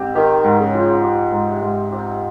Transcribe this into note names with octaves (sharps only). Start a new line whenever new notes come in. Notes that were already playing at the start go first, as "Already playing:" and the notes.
Already playing: G#2 C4 G4
D#3 G4
G#2
C#3
F3
G4
G#2
C3
G#2
C3 G4